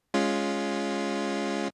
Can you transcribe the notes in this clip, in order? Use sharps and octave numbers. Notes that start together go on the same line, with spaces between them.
G#3 C#4 F4